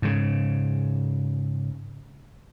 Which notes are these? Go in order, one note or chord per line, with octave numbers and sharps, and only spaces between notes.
G#2 C#3